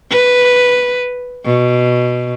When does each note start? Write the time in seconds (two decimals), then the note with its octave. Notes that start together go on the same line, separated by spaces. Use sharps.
0.10 B4
1.45 B2